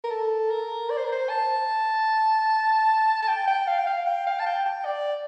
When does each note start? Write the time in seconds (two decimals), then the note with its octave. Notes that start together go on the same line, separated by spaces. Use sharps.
0.04 A#4
0.11 A4
0.51 A#4
0.90 D5
0.98 C5
1.05 A#4
1.12 C5
1.30 A5
3.22 A5
3.28 G5
3.48 G5
3.68 F5
3.79 G5
3.87 F5
4.07 G5
4.27 F5
4.39 A5
4.47 G5
4.66 G5
4.86 D5